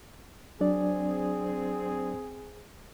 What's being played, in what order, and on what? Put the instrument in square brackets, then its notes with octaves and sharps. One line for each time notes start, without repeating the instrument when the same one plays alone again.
[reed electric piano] F#3 D4 D5 [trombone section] C4 G#4